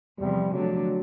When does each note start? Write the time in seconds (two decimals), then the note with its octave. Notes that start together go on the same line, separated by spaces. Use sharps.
0.19 E2 C3 F3 G3
0.53 D3 F3 F#3 A3 D4